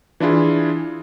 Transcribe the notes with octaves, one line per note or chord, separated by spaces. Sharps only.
E3 D4 E4 F4 G#4